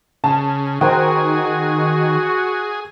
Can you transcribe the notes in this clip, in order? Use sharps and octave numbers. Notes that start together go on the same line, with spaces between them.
C#3 A5
D#3 F#4 G#4 A#4 C5 G5